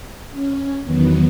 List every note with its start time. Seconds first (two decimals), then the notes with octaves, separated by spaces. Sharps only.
0.31 C#4
0.84 E2 D#3 F#3 B3